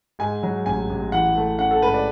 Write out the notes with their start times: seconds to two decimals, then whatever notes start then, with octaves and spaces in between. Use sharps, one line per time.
0.19 G#2 G#5
0.43 F#3
0.66 A1 G#5
0.89 A1
1.12 E3 F#5
1.35 A3
1.59 C#4 F#5
1.71 A4
1.82 G#2 B4
1.94 D5